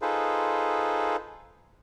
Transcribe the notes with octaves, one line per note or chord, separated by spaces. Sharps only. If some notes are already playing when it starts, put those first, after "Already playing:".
D#4 F4 G#4 A4 B4 C5